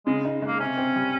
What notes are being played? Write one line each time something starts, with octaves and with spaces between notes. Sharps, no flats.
C#3 G#3
D#4
G#3
A#3
C3 C#4
C4
G3